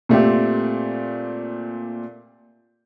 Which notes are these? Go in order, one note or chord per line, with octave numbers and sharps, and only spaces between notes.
A#2 A3 C4 G4